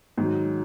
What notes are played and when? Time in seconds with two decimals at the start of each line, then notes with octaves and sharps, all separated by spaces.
0.17 G#2 D#3 F#3